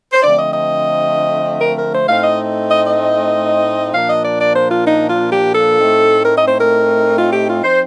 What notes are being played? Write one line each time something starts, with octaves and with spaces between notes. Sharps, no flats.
C5
D3 F3 A3 C4 D5
D#5
D#5
A#4
A#4
C5
A2 A3 C4 D#4 F5
D#5
D#5
D#5
A#2 F3 A#3 D4 F5
D#5
D5
D5
C5
F4
D#4
F4
G4
A4
A2 A3 C4 D#4
A#4
D#5
C5
A#4
F4
G4
F4
F3 C4 D#4 C5